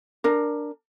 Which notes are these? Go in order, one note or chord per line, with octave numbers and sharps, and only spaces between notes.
D4 A#4